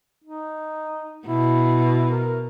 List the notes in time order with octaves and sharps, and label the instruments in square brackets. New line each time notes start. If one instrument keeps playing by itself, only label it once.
[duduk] D#4
[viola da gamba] B2 [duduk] E4
[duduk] A#4